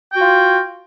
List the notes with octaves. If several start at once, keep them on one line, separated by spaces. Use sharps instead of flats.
F4 F#4 G5